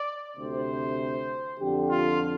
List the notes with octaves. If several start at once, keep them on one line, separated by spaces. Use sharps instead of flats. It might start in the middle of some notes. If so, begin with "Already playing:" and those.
Already playing: D5
D2 C3 C5
F2 D3 G4
F4